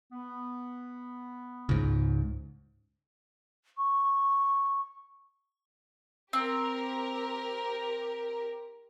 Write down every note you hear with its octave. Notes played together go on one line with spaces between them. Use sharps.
B3
C#2 G#2
C#6
C4 G4 A#4